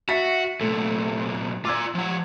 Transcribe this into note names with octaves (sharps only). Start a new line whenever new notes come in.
F#4 E5 A6 B6
C2 A#2 A3
F4 D5 D6 E6 G#6
F3 F#5